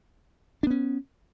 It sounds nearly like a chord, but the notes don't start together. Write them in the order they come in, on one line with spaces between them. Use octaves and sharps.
D4 B3 C#4